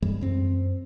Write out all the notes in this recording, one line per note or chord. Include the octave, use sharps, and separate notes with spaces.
G2 E3 G3 G#3
F#2 C4